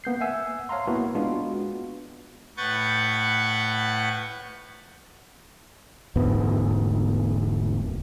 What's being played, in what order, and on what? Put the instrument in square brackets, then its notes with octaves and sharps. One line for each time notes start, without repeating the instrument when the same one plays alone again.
[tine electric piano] A#3 B3 G6 C7
E5 F#5 G#5 E6
C#5 F5 A5 A#5 C6
A#3 B3 E4 F#4
G#3 B3 D4 F4 F#4
[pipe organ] A2 B4 F#5 C#6 G6 A6
[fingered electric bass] E1 D2 G#2 B3